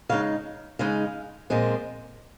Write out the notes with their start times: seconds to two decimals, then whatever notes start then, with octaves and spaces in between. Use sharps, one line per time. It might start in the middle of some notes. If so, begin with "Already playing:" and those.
0.09 C#3 G#3 D#4 F5
0.79 C#3 G#3 D#4 F5
1.50 A#2 F3 G#3 C4